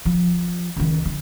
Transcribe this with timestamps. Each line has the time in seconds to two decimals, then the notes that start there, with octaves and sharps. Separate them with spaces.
0.05 F3
0.76 C#2 D#3
1.05 D3